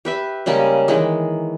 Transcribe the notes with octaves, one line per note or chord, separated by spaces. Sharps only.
G4 B4 E5
C#3 G3 G#3 A#3
D#3 E3 G#3